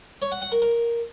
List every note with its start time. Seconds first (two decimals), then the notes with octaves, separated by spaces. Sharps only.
0.22 C#5
0.32 F#5
0.42 F#5
0.52 A#4
0.62 A#4